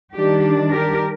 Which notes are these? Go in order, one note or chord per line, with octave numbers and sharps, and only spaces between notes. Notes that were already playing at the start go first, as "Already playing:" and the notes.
D#3 G3 D4 G4
G4 A#4